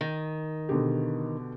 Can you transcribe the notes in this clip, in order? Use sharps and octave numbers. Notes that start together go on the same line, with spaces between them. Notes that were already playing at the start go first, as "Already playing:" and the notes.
D#3
B2 D3 G4